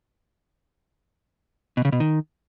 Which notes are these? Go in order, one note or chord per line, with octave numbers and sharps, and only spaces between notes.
B2
C#3
B2
D#3